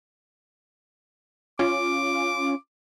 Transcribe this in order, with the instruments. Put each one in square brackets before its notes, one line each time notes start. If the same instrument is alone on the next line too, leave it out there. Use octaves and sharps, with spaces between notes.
[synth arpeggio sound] C#4 F4 [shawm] D6